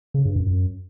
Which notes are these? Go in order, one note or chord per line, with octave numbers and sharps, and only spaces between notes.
C#3
G2
F#2
F#2